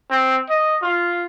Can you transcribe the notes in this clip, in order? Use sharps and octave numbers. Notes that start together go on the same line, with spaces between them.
C4
D#5
F4